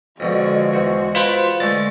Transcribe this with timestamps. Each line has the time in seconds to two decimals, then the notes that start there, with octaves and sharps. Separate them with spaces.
0.20 F2 B2 D3 G#3 F#4
0.73 E2 C5 F#5
1.15 F4 B4 C5 F#5
1.60 D3 G#3 A3 A6